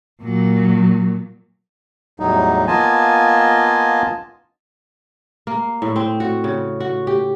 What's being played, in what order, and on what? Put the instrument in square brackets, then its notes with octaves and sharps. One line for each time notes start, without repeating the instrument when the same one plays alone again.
[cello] A#2 F#3
[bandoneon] E2 A2 F#3 G3 D#4
A#3 B3 F4 D#5 G#5 A5
[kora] A#3
A2
C4
F#4
C#3
F#4
G4